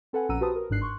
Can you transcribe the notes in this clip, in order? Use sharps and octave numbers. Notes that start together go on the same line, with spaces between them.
C4 A4 B4 F#5 G#5
A#1 C#4 F#5 A#5 E6 D#7
F#4 G4 B4 C5 A5 D#6
A#4
G1 G#2 D4 F#6 C7
C6 C#6 F#6